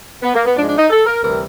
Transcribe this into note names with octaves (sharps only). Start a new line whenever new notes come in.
B3
A#3
B3
G#2 F3 G#3 D4
D4
D#4
A4
A#4
D2 C3 E3 G3 A#4